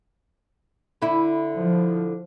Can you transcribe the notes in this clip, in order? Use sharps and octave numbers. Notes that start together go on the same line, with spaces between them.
D3 E4
F3